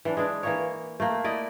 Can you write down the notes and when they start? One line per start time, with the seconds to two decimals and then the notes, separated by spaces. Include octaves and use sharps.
0.05 E3 D4
0.17 G#3 D4
0.43 E3 A#3 C#5
1.00 A3 A#3
1.24 E4 D5 D#5